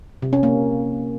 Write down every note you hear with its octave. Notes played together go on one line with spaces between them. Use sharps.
C3
C#4
A#3